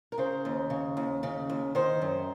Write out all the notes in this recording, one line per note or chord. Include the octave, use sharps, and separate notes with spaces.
A#4
C#3 C5
D#2
C#3
D#2
C#3
D#2
D#3 C5
F#2